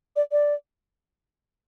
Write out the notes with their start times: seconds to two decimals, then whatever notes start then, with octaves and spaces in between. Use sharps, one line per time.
0.16 D5
0.32 D5